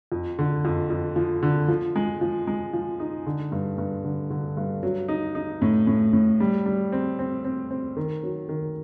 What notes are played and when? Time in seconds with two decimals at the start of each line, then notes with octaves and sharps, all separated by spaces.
0.12 F2
0.39 D3
0.65 F2
0.90 F2
1.16 F3
1.42 D3
1.68 F3
1.96 G#3
2.21 F3
2.47 G#3
2.74 F3
3.00 D#4
3.26 D3
3.52 G2
3.78 G2
4.04 D3
4.31 D3
4.57 G2
4.83 F#3
5.08 D#4
5.35 D#4
5.62 A2
5.87 A2
6.13 A2
6.40 G3
6.66 G3
6.92 C4
7.19 C4
7.45 C4
7.71 C4
7.97 D#3
8.23 F#3
8.49 D#3